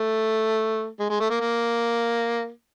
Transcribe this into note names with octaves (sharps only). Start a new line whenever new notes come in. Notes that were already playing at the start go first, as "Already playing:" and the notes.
Already playing: A3
G#3
G#3
A3
A#3
A#3